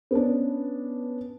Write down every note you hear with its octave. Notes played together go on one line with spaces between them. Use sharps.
B3 C#4 D4